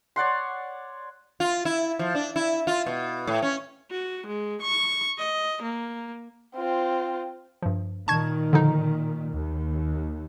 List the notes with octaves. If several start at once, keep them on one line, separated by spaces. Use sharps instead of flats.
C#5 D5 F#5 C6
F4
E4
F3
D4
E4
F4
B2
A2
C#4
F#4
G#3
C#6
D#5
A#3
C4 F4
G2 F3
A#2 D#3 A5 C#6 G#6
D3 F3 D#4
D#2